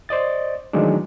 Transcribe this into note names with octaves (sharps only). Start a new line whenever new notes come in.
C5 D5 D#5 A6
D#3 E3 F#3 G#3 A3 D4